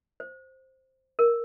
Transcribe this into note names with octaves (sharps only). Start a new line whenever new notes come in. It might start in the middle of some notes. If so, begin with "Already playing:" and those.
C5
A#4